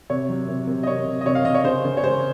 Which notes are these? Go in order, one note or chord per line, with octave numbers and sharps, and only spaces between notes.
C3 C#5
F#3
C3
C3
D#5
C3 C#5
C3
D#5
C3 C#5
F5
C3 D#5
C#5
C#3 C5
C#3
C#5
G#3 C5